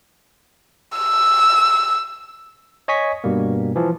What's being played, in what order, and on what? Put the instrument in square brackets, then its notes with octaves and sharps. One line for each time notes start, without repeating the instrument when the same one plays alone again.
[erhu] E6
[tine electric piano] C#5 D#5 G#5 C#6 B6
G2 B2 G3 A#3
E3 F3